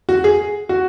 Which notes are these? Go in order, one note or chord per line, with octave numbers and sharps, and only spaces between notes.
F#4
G#4
F#4